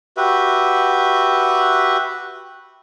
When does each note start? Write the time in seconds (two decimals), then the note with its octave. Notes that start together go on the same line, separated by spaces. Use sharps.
0.17 F#4 G4 B4 E5